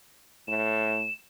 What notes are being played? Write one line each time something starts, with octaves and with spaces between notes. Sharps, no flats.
A2 E7